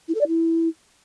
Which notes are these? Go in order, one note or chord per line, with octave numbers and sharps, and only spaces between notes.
E4
A4
D5
E4